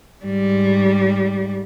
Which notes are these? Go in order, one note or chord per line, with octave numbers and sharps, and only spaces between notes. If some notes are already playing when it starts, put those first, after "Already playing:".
G#2 G3